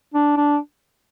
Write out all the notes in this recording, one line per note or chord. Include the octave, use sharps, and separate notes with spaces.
D4
D4